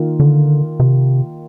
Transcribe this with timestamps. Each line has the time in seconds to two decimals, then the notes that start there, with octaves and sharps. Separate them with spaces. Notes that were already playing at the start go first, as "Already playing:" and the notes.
Already playing: D#3 A#3 F4
0.20 D3
0.80 C3